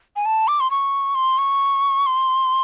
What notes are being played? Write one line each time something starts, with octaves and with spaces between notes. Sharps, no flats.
G#5
A5
D6
C6
C#6
C6
C#6
C6